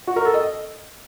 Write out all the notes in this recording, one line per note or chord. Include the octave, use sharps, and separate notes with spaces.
F#4
A#4
A4
D#5